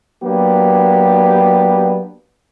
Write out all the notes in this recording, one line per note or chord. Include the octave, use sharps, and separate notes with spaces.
F#3 A#3 B3 D4 G4